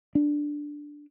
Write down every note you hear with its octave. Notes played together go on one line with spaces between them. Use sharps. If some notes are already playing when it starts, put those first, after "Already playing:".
D4